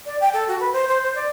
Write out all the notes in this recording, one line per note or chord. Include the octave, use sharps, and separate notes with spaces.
D5
G5
A4
F#4
B4
C5
C5
C5
D5